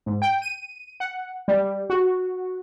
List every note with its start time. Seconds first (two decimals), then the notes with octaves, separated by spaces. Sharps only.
0.06 G#2
0.22 G5
0.42 D#7
1.00 F#5
1.48 G3
1.90 F#4